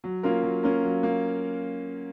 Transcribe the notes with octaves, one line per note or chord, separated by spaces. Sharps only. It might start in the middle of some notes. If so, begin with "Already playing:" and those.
F#3
A#3 C#4 F4 A#4
F#3
A#3 C#4 F4 A#4
F#3
A#3